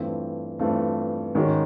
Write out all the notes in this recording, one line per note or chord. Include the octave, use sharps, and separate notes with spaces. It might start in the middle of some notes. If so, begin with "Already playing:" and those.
Already playing: G2 E3 A3 C4 F4
G2 E3 A3 C4 F4
G#2 D#3 G#3 C#4 F#4